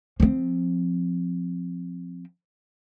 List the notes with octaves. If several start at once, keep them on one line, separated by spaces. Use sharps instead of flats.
F3 C4